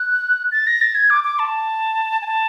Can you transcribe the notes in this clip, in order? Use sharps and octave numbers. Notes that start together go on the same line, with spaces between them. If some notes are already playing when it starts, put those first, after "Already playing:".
Already playing: F#6
A6
A#6
A6
G#6
D6
D6
A5
G#5
A5